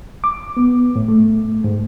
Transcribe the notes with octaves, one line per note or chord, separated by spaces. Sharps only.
D6
B3
A2
A3
G#2